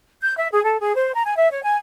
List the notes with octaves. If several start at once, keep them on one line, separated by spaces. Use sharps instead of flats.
G6
E5
G#4
A4
G#4
C5
A#5
G#5
E5
C#5
G#5